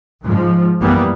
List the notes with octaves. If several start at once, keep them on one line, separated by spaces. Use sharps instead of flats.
G#2 F3
F#2 E3 G3 A#3 B3